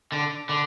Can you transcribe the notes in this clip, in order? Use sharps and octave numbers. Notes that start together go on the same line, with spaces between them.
D3
D3